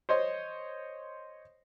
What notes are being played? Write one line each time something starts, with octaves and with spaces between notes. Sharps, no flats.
C5 C#5 D#5 C6